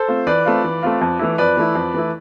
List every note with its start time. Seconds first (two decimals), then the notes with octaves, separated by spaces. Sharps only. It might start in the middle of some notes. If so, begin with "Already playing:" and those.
Already playing: A4 C5
0.08 A3 C4 F4
0.27 E3 B4 D5
0.45 A3 C4 F4
0.64 E3
0.83 A3 C4 F4
1.01 F2
1.19 E3 A3 E4
1.38 F2 B4 D5
1.57 E3 A3 E4
1.75 F2
1.94 E3 A3 E4